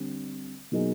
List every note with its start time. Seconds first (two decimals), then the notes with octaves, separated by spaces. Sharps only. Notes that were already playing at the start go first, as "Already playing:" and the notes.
Already playing: D3 G3 C4
0.72 B2 F#3 A#3 D#4 G#4